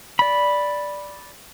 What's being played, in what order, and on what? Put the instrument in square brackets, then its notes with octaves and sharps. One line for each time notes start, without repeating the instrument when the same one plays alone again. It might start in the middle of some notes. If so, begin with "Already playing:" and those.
[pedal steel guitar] D5 B5